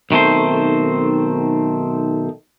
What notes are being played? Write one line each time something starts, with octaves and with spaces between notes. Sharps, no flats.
B1 D#3 A3 C4 C5